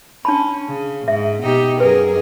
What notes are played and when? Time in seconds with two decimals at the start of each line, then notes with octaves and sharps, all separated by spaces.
0.25 C#4 D4 A5 B5
0.68 C#3
1.08 G#2 E5
1.43 B2 D#4 G4
1.80 F#2 G#4 A#4 B4